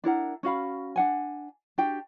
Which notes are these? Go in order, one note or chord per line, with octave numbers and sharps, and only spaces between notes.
D4 E4 A#4 F#5
C#4 F#4 F5 B5
D4 F#5 G#5
D4 F#4 G4 G5